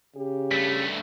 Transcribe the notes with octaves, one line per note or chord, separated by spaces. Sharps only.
C#3 G4
G2 A3 B6